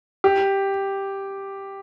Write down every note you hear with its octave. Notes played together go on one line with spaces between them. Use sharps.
G4